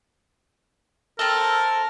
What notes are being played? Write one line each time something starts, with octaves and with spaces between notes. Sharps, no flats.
C4 A4 A#4